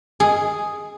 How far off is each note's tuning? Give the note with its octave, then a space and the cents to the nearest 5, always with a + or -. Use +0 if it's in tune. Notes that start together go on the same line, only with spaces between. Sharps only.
G#4 +0